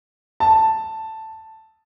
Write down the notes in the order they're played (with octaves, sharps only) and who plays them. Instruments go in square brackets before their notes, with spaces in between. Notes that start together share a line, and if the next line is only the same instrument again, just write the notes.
[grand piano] A5